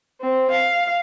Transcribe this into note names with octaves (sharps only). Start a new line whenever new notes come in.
C4
F5